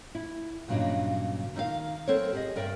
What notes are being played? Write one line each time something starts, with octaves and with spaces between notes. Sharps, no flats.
E4
G2 A#2 C#3 F#3 D4 D#5
D#3 D#4 E5 F5
F#3 C4 A4 A#4 C5 C#5
G4 G#4 D#5
G2 A#4 D5 E5 G5